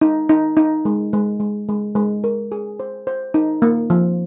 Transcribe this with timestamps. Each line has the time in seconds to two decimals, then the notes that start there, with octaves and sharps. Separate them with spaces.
0.01 D#4
0.29 D#4
0.57 D#4
0.85 G#3
1.13 G#3
1.40 G#3
1.69 G#3
1.95 G#3
2.24 A#4
2.52 G#4
2.80 C5
3.07 C5
3.34 D#4
3.62 A#3
3.90 F3